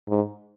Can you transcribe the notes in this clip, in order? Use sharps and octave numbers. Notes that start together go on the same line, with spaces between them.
G#2